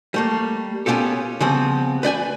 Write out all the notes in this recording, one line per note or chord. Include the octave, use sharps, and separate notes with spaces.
G3 A3 A#3
B3 C#4 F4 G4 A4
C#3 F3 G3 B3 C4
B4 D5 G5 G#5